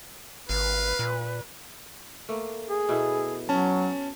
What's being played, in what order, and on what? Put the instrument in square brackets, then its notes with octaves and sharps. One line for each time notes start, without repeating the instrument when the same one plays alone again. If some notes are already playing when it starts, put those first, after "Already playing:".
[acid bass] G#1 [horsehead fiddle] B4 [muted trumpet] F5
[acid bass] A#2
[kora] A3 A#3
[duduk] G#4
[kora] B2 E4 A4
[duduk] F#3 [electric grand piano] C#4 A5